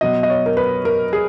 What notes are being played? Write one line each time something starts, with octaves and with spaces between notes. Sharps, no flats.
B2 F#3 D#5
D#5
C#5
A#4
B4
A#4
G#4